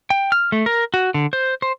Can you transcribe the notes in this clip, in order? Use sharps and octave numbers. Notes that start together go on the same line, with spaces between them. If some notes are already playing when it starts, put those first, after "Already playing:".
G5
F6
A3
A#4
F#4
D3
C5
C5